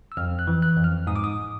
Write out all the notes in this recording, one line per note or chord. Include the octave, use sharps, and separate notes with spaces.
E6
F2 F6
F#6
E3
F#6
F2
F6
G#2 D#6
D6
D#6